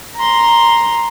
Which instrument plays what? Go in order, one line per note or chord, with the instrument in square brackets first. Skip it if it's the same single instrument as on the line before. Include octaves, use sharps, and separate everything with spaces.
[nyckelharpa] A#5 C6